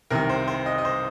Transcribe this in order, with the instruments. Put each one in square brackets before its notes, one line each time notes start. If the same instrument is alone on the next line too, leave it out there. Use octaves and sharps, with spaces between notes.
[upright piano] C2 C3 D#3 A#4
C5
C5
D#5
D#5
C5